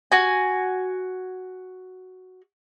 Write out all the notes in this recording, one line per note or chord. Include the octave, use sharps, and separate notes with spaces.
F#4 G#5